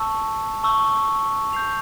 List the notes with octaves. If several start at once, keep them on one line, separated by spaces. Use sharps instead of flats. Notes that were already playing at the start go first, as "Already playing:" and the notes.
Already playing: A5 C#6 E6
A5 C#6 E6
G6 C7 F7